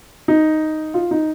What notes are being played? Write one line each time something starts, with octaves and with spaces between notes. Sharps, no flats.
D#4
F4
D#4